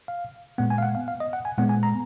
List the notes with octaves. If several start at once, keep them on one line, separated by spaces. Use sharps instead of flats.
F5
A#2 G#3 B3 F#5
G#5
F5
F#5
F5
F5
D#5
F#5
G#5
A#2 G#3 B3 F#5
G#5
A#5